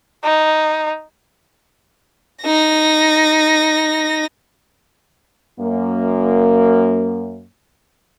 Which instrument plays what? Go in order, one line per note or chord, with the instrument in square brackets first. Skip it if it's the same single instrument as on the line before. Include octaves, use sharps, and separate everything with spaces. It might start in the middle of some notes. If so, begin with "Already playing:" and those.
[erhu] D#4
[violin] D#4 A#6
[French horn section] F#2 A#3